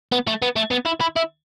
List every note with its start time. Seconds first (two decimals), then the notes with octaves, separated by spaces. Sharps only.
0.12 B3
0.27 A3
0.42 B3
0.56 A3
0.71 B3
0.86 E4
1.01 E4
1.16 E4